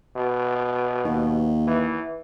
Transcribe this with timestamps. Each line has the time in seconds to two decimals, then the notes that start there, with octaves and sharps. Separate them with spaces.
0.16 B2
1.04 D#2
1.67 E3